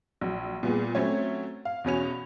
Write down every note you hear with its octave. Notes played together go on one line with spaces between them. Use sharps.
A#1 F#3
A#2 G3 B3 G#4
F#3 A3 C4 C#4 C#5
F5
E2 B2 C#4 F7